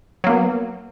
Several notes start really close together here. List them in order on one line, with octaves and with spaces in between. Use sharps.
F#3 A#3 B3